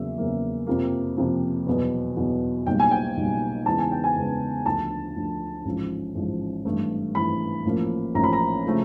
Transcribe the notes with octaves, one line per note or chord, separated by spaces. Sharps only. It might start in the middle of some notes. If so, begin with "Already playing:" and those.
Already playing: E2 C#3 F#3 A#3 E5
E2 C#3 F#3 A#3
F2 C3 F3 A#3
F2 C3 F3 A#3
E2 B2 F#3 B3
E2 B2 F#3 B3
B1 A#2 G3 G5
G#5
G5
B1 A#2 G3
E2 C#3 E3 G#3 B3 A5
G#5
G5
G#5
E2 C#3 E3 G#3 B3
D2 D3 F3 A5
D2 D3 F3
A1 G#2 F3
A1 G#2 F3
G#1 G2 E3 A3
G#1 G2 E3 A3 B5
A1 A2 F3 A#3
A1 A2 F3 A#3 A#5
B5
A#5
C#3 F3 A3 C4